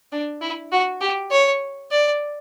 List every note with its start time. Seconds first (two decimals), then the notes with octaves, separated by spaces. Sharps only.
0.12 D4
0.42 E4
0.72 F#4
1.01 G4
1.31 C#5
1.91 D5